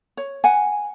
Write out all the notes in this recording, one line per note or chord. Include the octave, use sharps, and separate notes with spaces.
C#5
F#5 G#5